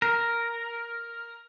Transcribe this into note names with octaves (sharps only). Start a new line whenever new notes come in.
A#4